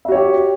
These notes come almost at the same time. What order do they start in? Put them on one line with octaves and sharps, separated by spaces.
E5 F#4 C#5 G4